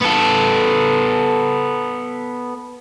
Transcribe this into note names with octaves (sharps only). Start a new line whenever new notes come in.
B3 A4